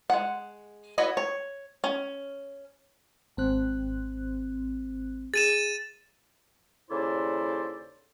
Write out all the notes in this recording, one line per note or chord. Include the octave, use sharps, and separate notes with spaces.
G#3 F#5
E4 F#4 B4 C#5 D#5
C#5
C#4
G#1 C4 F#6
G#4 A6 D#7 E7
D#2 C#3 E4 A4 C5 D5